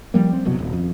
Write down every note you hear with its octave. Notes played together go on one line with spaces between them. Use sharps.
F3 G3 A#3
C4
F#1 C2 B2 F#3
D#1
F2